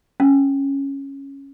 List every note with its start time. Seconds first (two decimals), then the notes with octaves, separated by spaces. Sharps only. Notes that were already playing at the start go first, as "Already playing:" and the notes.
0.20 C#4